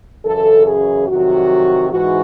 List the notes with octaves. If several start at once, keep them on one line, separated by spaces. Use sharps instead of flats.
F#2 C#3 E3 A4
G#4
F2 C3 D#3 F#3 F#4
G#2 E3 F#4